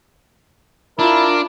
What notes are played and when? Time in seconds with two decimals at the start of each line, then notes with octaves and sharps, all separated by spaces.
0.99 D4 E4 F4 A#4